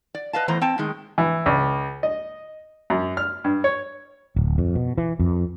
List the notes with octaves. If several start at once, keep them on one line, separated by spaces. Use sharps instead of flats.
D5
B4 D#5 F5 A5
E2 A2 E3 C5 A#5
C4 G5 A5
A2 D#3 G#3
E3
C#2
D#5
F#2
F6
G2
C#5
D1
F2
B2
E3
F2